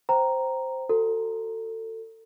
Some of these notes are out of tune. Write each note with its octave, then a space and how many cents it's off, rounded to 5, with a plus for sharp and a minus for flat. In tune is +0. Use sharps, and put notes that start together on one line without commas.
C5 +0 G5 -20 A#5 +0
F#4 +0 A4 +30